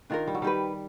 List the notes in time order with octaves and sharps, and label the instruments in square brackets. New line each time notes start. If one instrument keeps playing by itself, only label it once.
[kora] D#3 [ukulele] D4 F4 A#4
[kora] G3
F#3
[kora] G3 [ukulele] D#4 G4 B4